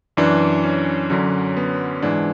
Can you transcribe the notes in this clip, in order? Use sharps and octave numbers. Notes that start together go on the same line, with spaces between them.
F#2 E3 D4
C#4
F#2 D3 F#3 C#4
B3
G#2 E3 D4